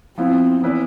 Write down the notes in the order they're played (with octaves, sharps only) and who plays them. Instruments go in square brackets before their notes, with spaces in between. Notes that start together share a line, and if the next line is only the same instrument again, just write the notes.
[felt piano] F3 B3 E4 [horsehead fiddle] C4
[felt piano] E3 B3 E4 B4 D5